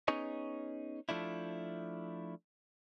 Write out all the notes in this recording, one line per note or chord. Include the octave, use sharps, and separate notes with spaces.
B3 C#4 D#4 G#4 C#5 D#5
F3 A3 D4 E4